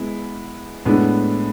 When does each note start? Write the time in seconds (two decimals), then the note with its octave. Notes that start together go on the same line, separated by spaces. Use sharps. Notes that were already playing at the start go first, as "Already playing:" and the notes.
Already playing: G#3 B3 E4
0.86 A2 G#3 B3 D4